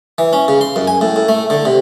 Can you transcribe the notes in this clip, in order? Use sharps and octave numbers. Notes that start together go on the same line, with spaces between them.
E3
C#4
C#3
C6
F#2
G#5
A2
A2
A3
D3
C3